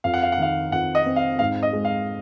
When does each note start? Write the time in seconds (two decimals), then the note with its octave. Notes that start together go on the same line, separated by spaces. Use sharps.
0.04 F2 F5
0.14 F#5
0.23 F5
0.32 F#5
0.38 D#3 F5
0.72 F2 F#5
0.95 D#5
1.06 C4
1.16 F5
1.39 G#2 F5
1.63 D#5
1.73 G#3
1.85 F5